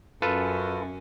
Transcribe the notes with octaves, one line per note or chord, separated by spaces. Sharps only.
F#2 C#4 F4 A4 B4